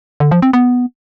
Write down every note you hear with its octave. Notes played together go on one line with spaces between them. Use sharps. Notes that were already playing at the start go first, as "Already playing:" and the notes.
D3
F3
C4
B3